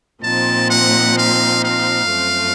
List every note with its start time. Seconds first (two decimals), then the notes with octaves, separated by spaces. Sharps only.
0.23 A#2 F3 C4 D#4 A5
0.70 F#5
1.18 F5
1.64 F5
2.11 F#2 F3 A3 C4